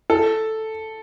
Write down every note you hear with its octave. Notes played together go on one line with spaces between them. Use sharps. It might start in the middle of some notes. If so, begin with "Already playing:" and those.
A4